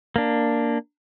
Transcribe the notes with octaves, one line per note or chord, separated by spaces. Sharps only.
A#3 D4